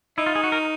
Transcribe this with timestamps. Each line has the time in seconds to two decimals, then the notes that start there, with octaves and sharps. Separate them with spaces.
0.18 D#4 E4
0.26 F4
0.35 G#4
0.44 F#4
0.52 A#4